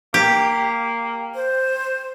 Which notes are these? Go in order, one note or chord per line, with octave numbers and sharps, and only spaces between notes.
A#3 G4
C5